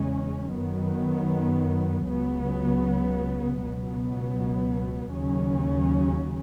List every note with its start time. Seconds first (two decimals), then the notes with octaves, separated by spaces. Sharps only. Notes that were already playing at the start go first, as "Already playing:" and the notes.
Already playing: E2 C#3 G#3 C#4
0.52 F#2 D#3 F#3 B3
2.06 C#2 C#3 F#3 B3
3.59 C#2 B2 F#3 B3
5.14 D#2 C#3 F#3 C#4